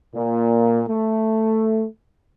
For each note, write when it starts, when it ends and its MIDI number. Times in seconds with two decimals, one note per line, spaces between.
0.15 0.82 46
0.88 1.84 57